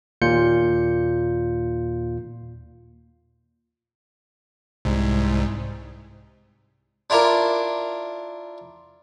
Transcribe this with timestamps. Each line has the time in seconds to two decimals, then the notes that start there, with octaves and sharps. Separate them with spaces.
0.22 D#2 A#2 F4 G6 C#7
4.85 C2 G#2
7.10 D4 E4 F4 A#4 D6